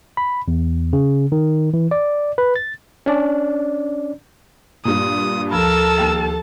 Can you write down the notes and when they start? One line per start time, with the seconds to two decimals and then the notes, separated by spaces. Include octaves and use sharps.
0.17 B5
0.48 E2
0.93 C#3
1.32 D#3
1.74 E3
1.91 D5
2.38 B4
2.56 A6
3.06 C#4 D4 D5
4.85 G2 A#2 D#6
5.51 D2 F3 A4 A#4 A5 B5 E6
5.98 D#2 G5 F7